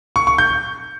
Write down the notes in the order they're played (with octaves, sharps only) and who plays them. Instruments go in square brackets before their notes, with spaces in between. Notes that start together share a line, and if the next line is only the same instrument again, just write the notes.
[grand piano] C#6
C#6
G6